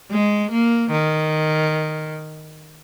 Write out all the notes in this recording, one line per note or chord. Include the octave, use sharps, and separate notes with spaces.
G#3
A#3
D#3